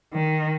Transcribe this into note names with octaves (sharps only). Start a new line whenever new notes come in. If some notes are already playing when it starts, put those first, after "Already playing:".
D#3